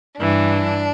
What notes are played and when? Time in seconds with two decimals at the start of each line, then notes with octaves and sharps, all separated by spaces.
0.18 G2 E3 D4